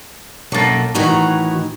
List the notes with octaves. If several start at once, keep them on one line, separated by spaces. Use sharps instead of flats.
B1 F#2 F#3 A#3 A4
A2 D#3 E3 F#4 A#5